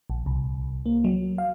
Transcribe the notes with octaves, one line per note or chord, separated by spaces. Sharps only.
A#1
C2
A#3
F#3
F5